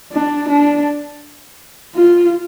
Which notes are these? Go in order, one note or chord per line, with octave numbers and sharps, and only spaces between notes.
D4
D4
F4